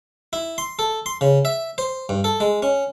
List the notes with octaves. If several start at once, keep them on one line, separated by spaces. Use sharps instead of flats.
E4
C6
A4
C6
C#3
E5
C5
G2
A4
G#3
C#4